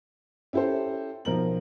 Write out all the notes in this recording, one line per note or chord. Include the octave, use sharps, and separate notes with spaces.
C#4 E4 G4 A4 C5
B1 F3 A#4 F#7